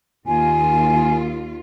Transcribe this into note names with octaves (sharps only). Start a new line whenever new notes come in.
D#2 D#3 F4 G#5